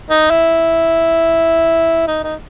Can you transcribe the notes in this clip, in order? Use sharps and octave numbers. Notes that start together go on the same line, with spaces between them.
D#4
E4
D#4
D#4